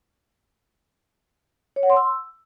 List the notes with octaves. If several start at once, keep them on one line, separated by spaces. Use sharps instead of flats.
C#5
F#5
C6
E6